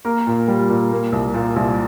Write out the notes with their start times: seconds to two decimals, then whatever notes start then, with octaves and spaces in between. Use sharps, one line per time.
0.05 A#3 A#4
0.27 A#2
0.48 G3
0.69 A#2
0.91 A#3
1.12 C2
1.34 A#2
1.56 C2